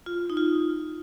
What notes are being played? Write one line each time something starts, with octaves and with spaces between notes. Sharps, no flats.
F4
D#4
F4